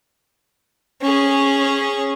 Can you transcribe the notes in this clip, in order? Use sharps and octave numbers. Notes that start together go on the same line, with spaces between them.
C#4 G#4